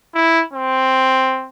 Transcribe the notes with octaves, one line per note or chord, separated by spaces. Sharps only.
E4
C4